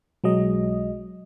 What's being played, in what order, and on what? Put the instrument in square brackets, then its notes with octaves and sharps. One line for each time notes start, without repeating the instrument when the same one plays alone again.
[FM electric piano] B1 F#3 G#3 D#5